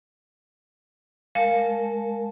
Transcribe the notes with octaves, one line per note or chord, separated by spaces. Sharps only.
G#3 A#4 F5 A5